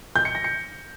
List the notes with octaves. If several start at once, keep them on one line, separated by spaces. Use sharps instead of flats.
G6
C#7
A#6
C#7